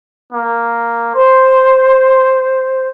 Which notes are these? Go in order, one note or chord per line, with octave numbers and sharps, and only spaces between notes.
A#3
C5 C6